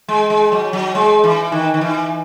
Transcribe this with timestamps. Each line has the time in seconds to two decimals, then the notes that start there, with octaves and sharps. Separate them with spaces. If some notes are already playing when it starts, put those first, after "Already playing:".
0.08 G#3
0.30 G#3
0.52 F#3
0.73 F#3
0.95 G#3
1.24 E3
1.52 D#3
1.74 D#3
1.81 E3